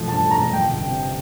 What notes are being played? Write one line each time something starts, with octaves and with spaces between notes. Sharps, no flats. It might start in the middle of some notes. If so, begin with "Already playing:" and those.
Already playing: E1 A1 F3 A3
G2 A5
A3
A#5
A1
F3 G5
G1
C3